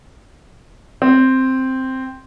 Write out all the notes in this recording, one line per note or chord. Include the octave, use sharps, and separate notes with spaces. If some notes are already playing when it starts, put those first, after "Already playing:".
C4